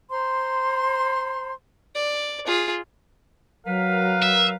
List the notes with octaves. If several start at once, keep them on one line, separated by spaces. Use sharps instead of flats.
C5 A#5 C6
D5
F4 G#4
F#3 A#4 B4 F5
E5